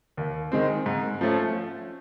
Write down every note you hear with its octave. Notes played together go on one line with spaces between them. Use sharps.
D#2
D#3 G#3 C4
G#2
F3 A3 C#4